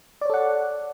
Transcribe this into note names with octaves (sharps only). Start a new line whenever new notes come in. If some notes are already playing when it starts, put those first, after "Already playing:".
A4 C#5 D5 F#5